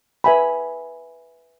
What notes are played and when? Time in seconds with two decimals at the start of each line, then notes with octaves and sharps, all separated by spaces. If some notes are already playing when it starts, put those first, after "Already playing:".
0.24 B4 E5 G#5 B5